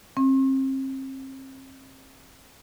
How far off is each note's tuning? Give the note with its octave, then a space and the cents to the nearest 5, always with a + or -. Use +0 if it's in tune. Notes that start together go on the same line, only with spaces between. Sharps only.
C4 +35